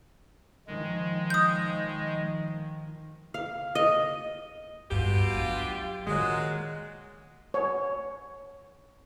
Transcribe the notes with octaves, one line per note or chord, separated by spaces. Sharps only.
D#3 F3 G#3
D#6 G6
F5
D#5
G2 B2 F4 G4
F#3 D4
A#2 D#3 F#3 G#3
C#5